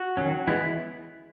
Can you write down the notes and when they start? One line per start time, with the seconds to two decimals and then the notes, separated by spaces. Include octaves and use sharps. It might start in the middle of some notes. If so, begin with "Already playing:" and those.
Already playing: F#4
0.17 D#3 F#3 C#4
0.47 E3 G#3 B3 E4